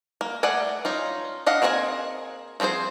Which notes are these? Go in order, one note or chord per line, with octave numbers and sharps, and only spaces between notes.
A#3
A3 G#4 D5 F#5 G#5
C#4 D#4 F4
D4 D#5 F5 F#5
A#3 C4 G#4 D#5 G#5
F3 C4 D#4 G#4 C5